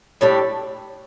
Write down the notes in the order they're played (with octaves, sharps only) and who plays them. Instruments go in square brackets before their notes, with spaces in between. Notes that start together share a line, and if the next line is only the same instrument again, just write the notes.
[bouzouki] A2 G3 D4 A4